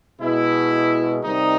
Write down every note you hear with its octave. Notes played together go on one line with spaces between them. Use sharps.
B2 G#3 E4
C3 D#3 G3 D#4